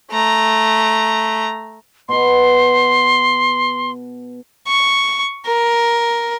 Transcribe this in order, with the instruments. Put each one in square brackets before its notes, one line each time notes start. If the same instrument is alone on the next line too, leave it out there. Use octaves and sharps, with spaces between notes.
[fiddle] A3 A#5
[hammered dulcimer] B2 B4 [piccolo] C6
[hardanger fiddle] C#6
A#4